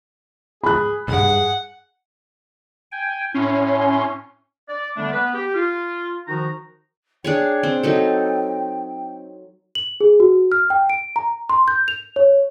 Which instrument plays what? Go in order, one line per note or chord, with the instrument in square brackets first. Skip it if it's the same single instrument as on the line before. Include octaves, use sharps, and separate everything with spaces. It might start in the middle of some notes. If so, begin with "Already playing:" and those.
[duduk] G#4 [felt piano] B5 F#6
[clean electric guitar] B1 G2 [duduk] G#4 [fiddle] F#5
[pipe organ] G5 G#5
[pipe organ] A2 C6 [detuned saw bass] C#4
[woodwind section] D5
D3 G3 A3 B3 D4
B3 B4
G4
F4
D#3 F3 D#4 F#4 A#5
[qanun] D4 G#4 C#5 [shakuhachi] G5
[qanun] C4
F#3 D#4 A4
[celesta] F#7
G#4
F#4
F6
G5
D7
A#5
C6
G6
F7
C#5